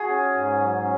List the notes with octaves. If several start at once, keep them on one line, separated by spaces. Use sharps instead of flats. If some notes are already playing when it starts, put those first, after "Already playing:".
Already playing: F#4 G#4
C#4
G#2
F#3
C#4